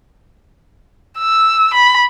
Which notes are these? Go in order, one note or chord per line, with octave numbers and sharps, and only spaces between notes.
E6
B5